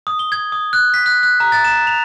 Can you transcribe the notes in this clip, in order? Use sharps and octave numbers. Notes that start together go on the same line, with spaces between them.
D#6
G7
G#6
D#6
F#6
B6
F#6
F#6
A#5
A6
E7
F7